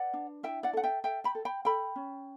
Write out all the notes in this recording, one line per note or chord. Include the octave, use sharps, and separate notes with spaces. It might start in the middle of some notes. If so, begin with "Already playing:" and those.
Already playing: B4 D5 F#5
D4
E4 E5 G5
D5 F#5
A4 F#5
E5 G5
A4 E5 G5
G5 B5
A4
G5 B5
A4 G5 B5
C#4